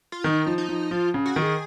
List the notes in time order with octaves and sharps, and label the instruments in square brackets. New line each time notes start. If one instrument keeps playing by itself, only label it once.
[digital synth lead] F4
[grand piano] D#3 [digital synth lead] D#4
[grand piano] F3
[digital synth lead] D#4
[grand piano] F3
[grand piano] F3 [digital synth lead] F4
[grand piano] C#3
[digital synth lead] F#4
[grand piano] D#3
[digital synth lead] G#4